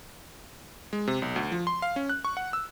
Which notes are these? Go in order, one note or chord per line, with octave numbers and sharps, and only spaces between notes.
G#3
C3
B1
D2
F3
C6
F5
C#4
F#6
C#6
F#5
E6